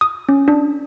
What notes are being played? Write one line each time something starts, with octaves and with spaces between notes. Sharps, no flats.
D#6
C#4
D4